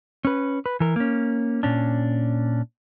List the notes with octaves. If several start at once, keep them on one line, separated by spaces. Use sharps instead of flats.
C#4 B4
B4
E3 A#4
A#3 C#4
A#2 C#4 D4